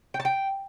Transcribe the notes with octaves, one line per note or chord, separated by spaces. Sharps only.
G5
A5
G5